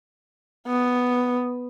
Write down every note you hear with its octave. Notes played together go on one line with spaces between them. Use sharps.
B3